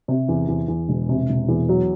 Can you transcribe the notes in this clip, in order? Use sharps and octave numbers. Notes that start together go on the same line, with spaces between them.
C3
E2
E2
E2
E1
C3
E1
E2
F#3